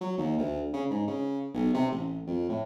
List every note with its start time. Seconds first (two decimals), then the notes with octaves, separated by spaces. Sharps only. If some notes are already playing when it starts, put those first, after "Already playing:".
0.01 F#3
0.18 D#2
0.38 D2
0.73 C#3
0.90 G#2
1.07 C#3
1.54 B1
1.74 C3
1.91 A1
2.27 F2
2.49 A2